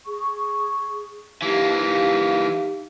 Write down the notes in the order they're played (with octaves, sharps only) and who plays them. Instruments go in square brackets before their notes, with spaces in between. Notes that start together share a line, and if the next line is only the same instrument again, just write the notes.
[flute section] G#4 C#6
[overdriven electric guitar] E3 A#3 [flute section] D#4 G4 F5